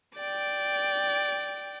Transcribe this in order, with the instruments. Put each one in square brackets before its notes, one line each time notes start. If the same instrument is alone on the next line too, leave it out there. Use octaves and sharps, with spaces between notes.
[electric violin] D5 G5